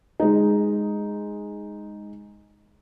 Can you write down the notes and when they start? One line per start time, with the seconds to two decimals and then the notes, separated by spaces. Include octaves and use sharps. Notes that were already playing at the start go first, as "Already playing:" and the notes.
0.20 G#3 D#4